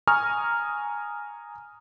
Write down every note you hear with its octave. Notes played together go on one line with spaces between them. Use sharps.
G#5 A#5 C#6 D#6 F6